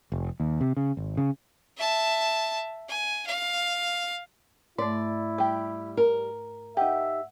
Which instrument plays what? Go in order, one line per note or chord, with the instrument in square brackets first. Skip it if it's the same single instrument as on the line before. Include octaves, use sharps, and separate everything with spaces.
[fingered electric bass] F1
D#2
C3
C#3
G#1
C#3
[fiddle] E5 A5
G#5
F5
[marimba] G#2 A3 [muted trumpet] E4 [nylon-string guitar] D5
[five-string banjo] G3 G4
[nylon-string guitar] A#4
[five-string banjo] D#4 G4 [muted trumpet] E5 [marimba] F#5